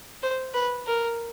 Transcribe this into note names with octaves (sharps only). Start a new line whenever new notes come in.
C5
B4
A#4